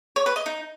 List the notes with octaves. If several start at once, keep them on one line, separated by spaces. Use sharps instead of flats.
C#5
B4
D#5
D#4